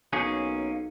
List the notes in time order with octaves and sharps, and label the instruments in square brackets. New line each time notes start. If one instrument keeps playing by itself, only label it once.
[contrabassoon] B1 [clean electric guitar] A#3 C#4 G#4